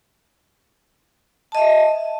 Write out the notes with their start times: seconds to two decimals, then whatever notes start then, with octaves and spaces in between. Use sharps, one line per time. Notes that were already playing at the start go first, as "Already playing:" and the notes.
1.52 A5
1.55 D#5
1.57 E5